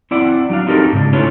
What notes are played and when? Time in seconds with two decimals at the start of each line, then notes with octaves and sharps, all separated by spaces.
0.11 C4 E4 D5 F#5
0.50 F#3 D4 F5
0.67 C4 D#4 F#4 G4 A4 A#4
0.93 G#2 C#3 D4
1.13 A3 C#4 D4 E4 F4 C#5